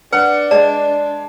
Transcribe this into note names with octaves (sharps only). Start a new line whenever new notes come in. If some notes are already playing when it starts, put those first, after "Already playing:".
D4 B4 F#5
G#3 D5 A5